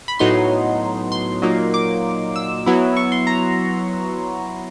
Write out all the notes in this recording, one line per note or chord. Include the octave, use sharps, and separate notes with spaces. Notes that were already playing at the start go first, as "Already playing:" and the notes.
B5
A2 F#3 B3 D#4 C6
C6
A#2 F#3 A#3 D#4
D6
E6
F#3 B3 E4
C#6
C6
A#5